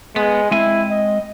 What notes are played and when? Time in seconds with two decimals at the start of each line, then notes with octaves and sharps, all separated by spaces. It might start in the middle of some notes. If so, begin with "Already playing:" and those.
0.16 G#3 B3
0.51 G#3 C4 E4 G#5
0.91 D#5